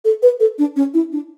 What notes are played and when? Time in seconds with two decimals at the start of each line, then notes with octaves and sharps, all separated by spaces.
0.05 A4
0.23 B4
0.40 A4
0.59 D4
0.76 C#4
0.94 E4
1.12 D4